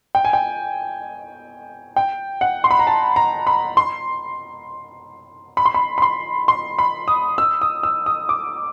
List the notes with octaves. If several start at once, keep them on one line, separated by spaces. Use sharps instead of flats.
G5
G#5
G5
G5
F#5
C6
B5
A#5
A5
A#5
B5
C6
B5
C6
B5
B5
C6
C6
B5
D#6
E6
D#6
E6
D#6
D6